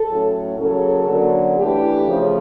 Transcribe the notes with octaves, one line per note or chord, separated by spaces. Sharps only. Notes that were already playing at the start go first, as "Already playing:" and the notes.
Already playing: A4
A2 F#3 A3 C#4
C#3 F#3 A#3 C#4 A4
D3 F#3 A#3 C#4
E3 A3 D4 G4
C#3 F3 A3 C#4